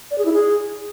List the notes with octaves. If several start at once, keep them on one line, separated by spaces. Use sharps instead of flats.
D5
G#4
E4
G#4